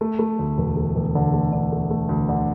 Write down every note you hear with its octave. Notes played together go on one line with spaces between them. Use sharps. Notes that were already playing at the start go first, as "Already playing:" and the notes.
A3
A3
D2
E1
A3
E1
D3
A3
D3
A3
A3
D2
D3